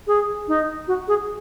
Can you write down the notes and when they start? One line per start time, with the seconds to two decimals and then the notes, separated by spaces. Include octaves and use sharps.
0.07 G#4
0.48 D#4
0.88 F#4
1.08 G#4